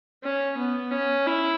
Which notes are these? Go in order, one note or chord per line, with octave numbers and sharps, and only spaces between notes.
C#4
B3
C#4
E4